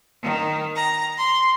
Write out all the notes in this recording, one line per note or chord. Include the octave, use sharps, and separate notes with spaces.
D#3
A#5
C6